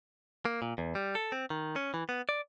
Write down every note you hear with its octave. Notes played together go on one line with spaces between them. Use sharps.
A#3
A#2
E2
G3
A4
C4
D#3
C#4
E3
B3
D5